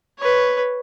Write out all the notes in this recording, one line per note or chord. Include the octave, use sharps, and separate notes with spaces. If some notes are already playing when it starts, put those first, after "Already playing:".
B4 C#5